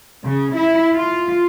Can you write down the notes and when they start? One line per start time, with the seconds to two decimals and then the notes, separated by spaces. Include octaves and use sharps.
0.25 C#3
0.55 E4
0.92 F4